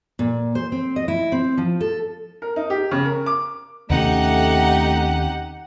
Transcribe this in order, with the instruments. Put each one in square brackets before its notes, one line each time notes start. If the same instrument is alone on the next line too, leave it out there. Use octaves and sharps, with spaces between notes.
[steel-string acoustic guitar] A#2
C5
C4
D#5
E4
C4
F3
A4
[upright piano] A#4
D#4
G4
C#3
A#4
D6
[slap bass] D#2 C3 C#4 [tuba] A3 [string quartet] D#4 G4 [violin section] F#5